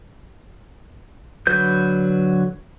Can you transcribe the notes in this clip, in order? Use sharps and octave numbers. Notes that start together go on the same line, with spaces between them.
D3 F#3 B4 G6